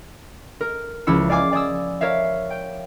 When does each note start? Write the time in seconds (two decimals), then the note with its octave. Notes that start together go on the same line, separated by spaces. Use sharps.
0.61 A#4
1.07 C#2 F3 E4 E6 C#7
1.30 D5 F5 G#5 D6
1.53 D5 G#5 D#6 E6
2.01 A#4 C#5 E5 F5
2.50 G5